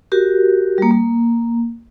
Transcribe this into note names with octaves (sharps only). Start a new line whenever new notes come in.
F#4 G4 A#4
G3 A#3
A#3